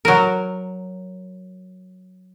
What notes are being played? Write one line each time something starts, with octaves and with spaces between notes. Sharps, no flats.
F#3 A#4